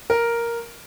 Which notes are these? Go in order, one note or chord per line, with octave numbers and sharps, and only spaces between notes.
A#4